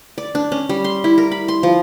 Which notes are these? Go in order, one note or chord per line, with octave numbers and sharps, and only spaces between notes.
D5
D4
C#4
G3
C6
E4
A#4
B5
C6
F3